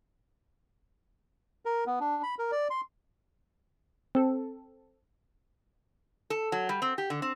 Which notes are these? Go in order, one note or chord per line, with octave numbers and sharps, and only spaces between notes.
A#4
B3
D4
B5
A#4
D5
C6
C4 A4
A4
F#3
G3
C4
G4
D3
C4